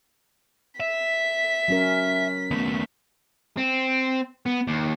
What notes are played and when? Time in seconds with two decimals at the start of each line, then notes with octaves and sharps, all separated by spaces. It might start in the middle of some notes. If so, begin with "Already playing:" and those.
0.80 E5 B6
1.68 F#3 C#4 A#4
2.51 D#2 A3 B3
3.57 C4
4.46 B3
4.67 D#2